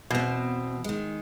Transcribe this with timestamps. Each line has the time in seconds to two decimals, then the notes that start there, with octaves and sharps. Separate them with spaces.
0.10 E2 B2 C4
0.84 D#3 G#3